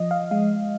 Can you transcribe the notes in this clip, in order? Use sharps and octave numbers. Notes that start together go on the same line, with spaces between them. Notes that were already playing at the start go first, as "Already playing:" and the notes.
Already playing: F3 D#5
F5
G#3 F5